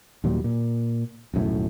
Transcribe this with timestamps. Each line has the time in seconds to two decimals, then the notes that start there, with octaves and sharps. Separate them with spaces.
0.24 D#2 A#2 F#3 G3
0.44 A#2
1.34 D#1 B1 F#2 A2